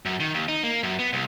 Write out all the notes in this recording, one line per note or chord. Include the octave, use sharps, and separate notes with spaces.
F#2
D#3
D#2
D#4
A#3
F#2
B3
C2